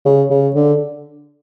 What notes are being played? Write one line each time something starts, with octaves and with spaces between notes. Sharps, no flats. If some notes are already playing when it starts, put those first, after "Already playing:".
C#3
C#3
D3